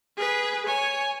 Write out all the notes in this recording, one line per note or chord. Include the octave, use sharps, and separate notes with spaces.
G#4 B4
C#5 G#5